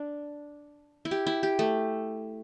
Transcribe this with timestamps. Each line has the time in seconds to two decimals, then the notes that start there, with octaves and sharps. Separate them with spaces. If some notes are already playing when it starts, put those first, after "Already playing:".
Already playing: D4
1.05 E4
1.11 G4
1.27 E4
1.43 G4
1.59 A3